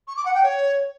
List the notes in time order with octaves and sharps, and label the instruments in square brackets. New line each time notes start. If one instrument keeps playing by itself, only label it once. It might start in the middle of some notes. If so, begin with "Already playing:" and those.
[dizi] C#6
D6
F#5
G5
C#5